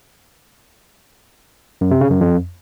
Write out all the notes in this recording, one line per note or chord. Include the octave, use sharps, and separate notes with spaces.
F#2
C3
C#3
F#2
F2